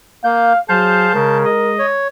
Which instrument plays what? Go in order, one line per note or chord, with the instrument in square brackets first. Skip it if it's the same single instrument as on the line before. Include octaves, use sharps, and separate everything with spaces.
[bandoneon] A#3 G6 [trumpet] F5
[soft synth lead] F#3 [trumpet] G#4 [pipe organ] C5 F5 [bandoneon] A5 G6
[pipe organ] C#3 [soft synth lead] G#3 [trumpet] A#4
[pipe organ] D#5
[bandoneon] C#5